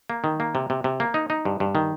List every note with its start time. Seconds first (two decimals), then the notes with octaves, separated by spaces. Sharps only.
0.10 A#3
0.24 D#3
0.40 A#3
0.55 C3
0.70 C3
0.84 C3
1.00 A#3
1.14 D#4
1.30 D#4
1.45 G2
1.60 G2
1.75 D#3